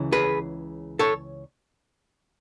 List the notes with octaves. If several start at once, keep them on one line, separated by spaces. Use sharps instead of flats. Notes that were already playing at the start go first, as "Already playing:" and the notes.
Already playing: C#2 C#3 E3
G#4 B4
A4 C#5